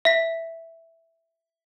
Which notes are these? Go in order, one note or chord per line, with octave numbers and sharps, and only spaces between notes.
E5 B6